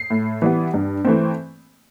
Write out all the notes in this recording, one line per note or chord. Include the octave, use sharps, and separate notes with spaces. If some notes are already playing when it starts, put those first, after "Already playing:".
Already playing: C7
A2
E3 G3 B3
G2
E3 A3 C4